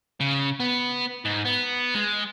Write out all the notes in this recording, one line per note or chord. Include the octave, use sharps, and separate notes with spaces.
C#3
B3
G#2
B3
G#3